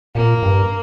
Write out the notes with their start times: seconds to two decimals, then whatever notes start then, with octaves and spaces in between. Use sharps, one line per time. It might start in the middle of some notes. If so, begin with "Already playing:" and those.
0.15 A#2 A#3
0.43 G2